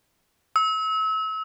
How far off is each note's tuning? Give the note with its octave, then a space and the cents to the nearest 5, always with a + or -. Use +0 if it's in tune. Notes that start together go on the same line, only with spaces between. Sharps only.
E6 -35